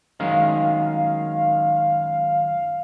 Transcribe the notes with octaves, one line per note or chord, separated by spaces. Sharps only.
F#2 D#3 G#3 F5